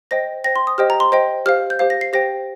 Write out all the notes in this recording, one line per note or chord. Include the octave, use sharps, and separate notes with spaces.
C5 D#5 G5 A#6
C5 G5 A#6
C6
D#6
G4 C5 D#5 G5 F6
A#5
C6
C5 D#5 G5
G4 C5 F5 F6
G6
G4 C5 F5
A#6
C7
G4 C5 G5 A#6